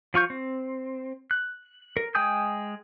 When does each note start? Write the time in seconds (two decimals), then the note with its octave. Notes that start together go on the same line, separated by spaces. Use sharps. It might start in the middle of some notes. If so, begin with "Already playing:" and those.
0.14 F3 F4 C#6 G6
0.30 C4
1.31 F#6
1.97 A#4
2.15 G#3 G5 G#5 D#6 G6